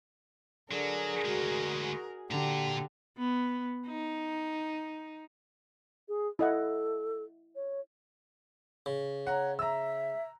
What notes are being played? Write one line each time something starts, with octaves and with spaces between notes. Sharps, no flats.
D3 F#3 G#4 A#4
D2 G#3 F#4
A#2 D3 G4 A#5
B3
D#4
G#4
E4 A4 D#5 F#5
C#5
C#3
C#5 F#5 A#5
E5 A#5 E6